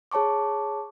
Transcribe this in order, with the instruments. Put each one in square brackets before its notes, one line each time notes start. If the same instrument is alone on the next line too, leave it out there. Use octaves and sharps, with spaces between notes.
[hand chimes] G#4 C#5 A5 C#6 D6